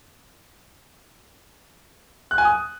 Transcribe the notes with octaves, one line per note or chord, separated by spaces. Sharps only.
F#6
G#5
D#6